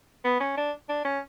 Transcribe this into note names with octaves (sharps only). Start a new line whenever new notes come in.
B3
C#4
D4
D4
C#4